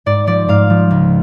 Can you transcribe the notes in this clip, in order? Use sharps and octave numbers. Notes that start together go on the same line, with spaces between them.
G#2 D5
F3 D5
G#2 F5
F3
C#2